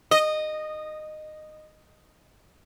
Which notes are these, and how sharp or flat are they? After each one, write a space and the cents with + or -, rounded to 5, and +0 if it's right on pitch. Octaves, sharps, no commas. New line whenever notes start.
D#5 -15